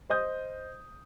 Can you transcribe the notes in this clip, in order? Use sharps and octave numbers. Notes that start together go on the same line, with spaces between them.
C5 D#5 D#6 G6